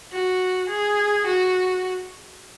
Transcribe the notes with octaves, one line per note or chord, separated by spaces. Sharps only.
F#4
G#4
F#4